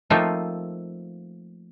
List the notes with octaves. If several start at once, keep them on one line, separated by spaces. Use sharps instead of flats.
F3 A3 A#3 C4 D#4 F4